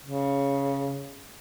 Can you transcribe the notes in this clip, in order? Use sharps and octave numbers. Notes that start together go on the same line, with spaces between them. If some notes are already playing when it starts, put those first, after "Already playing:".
C#3